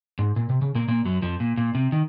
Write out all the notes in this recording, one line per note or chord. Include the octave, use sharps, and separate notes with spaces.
G#2
A#2
C3
C#3
A#2 A#3
A#2 A#3
F#2 F#3
F2 F3
A#2
A#2
C3
D#3